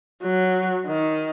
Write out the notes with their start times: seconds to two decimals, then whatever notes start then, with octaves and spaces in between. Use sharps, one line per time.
0.22 F#3
0.87 D#3